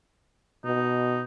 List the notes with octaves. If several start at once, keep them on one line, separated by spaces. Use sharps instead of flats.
B2 D#4